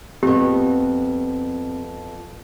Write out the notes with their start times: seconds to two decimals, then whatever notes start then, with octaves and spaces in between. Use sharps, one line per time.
0.23 F2 B3 C4 G4